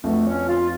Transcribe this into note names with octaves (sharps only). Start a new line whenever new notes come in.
F2 F3 A3 B3 D4 F#4
C#4
F4